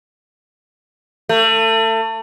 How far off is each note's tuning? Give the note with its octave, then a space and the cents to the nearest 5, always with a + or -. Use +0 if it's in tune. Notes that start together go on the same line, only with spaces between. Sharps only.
A3 +30